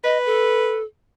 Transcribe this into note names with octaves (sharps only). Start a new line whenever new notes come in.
B4 D#5
A4